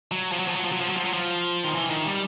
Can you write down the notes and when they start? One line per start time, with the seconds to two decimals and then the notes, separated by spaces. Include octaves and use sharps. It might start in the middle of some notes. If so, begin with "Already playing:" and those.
0.11 F#3
0.32 F3
0.39 F#3
0.48 F3
0.56 F#3
0.64 F3
0.72 F#3
0.81 F3
0.89 F#3
0.97 F3
1.05 F#3
1.13 F3
1.64 D#3
1.75 E3
1.90 D#3
2.05 G3